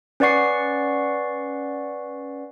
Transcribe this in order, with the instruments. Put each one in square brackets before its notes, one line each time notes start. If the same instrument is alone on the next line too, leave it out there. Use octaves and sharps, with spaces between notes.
[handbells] C#4 B4 D5 F#5 C#6 C7